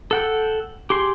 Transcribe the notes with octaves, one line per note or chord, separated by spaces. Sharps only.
A4 F#5 G5
G4 G#4 C6